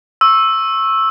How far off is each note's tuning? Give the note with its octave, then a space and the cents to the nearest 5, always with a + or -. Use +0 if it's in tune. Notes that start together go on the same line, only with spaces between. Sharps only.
C#6 -25 E6 +0